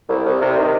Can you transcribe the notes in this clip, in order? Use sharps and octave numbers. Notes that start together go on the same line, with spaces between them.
C2
C2
C3
D#3